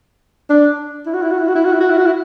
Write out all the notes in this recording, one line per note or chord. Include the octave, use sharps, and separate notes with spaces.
D4
E4
F#4
E4
F#4
E4
F#4
E4
F#4
E4
F#4
E4
F#4
E4